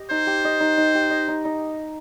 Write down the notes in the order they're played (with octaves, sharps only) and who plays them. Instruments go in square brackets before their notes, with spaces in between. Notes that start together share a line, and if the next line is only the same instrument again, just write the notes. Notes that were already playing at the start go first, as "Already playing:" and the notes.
Already playing: [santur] G4 D#5
[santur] D#4 [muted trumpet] C5
[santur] G4
D#5
D#4
D#4
G4
D#5
D#4
D#4